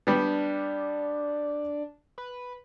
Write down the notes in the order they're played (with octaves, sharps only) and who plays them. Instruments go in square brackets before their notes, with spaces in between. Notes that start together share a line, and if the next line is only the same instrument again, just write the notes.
[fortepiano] G3 B3 [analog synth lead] D4
[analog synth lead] B4